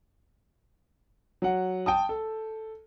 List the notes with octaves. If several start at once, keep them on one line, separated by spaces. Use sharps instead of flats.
F#3 F#5
G5 A5 D#6
A4